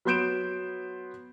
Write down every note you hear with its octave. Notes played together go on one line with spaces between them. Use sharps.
F#3 B3 C6 G6 D7 E7